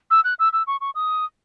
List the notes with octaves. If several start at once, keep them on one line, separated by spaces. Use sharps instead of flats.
E6
F#6
E6
E6
C#6
C#6
D#6